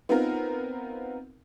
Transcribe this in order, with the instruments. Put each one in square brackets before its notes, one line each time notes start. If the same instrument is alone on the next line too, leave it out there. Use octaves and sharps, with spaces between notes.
[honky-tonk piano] B3 C4 D#4 F4 A#4